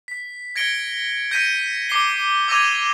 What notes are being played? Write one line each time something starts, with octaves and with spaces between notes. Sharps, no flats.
B6
G#6 A#6 C#7 D7 G7
G6 A#6 B6 C#7 D#7
D6 A#6 C7 G7
D6 E6 G#6 A#6 D#7 F7